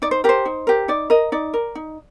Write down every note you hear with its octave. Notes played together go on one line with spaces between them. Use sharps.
D#4 D5
C5
G4 A#4 C5
D#4
G4 A#4
D#4 D5
A#4 D#5
D#4 D5
A#4
D#4